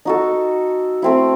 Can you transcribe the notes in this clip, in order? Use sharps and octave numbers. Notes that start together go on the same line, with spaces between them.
D#4 F#4 A4
A3 C4 E4